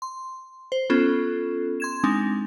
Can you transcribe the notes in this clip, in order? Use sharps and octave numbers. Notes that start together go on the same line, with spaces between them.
C6
C5
B3 C#4 F4 A4
C6 G#6 E7
G#3 C4 D4 D#4